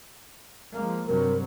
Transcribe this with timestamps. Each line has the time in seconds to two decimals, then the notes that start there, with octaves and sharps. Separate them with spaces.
0.73 F3 G#3 A#3
1.07 G2 C3 F#3 A#4